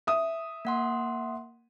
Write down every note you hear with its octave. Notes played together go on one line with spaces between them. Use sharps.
E5 D#6
A#3 F#5 C6